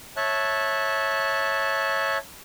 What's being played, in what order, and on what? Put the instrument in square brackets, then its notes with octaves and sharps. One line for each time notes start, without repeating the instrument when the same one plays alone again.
[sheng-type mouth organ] C#5 E5 A5 F#6